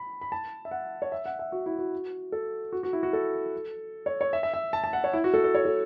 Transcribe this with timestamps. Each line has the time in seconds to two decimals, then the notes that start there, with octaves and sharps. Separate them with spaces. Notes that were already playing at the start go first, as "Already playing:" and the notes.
Already playing: B5
0.21 B5
0.32 A5
0.65 E5
0.71 F#5
1.02 C#5
1.12 E5
1.26 F#5
1.39 E5
1.52 F#4
1.66 E4
1.79 F#4
2.32 A4
2.73 F#4
2.83 F#4
2.93 E4
3.03 F#4
3.13 A4
4.06 C#5
4.21 C#5
4.33 E5
4.43 E5
4.54 E5
4.73 A5
4.84 A5
4.93 F#5
5.04 C#5
5.13 E4
5.24 F#4
5.34 A4
5.44 A4
5.55 C#5
5.65 A4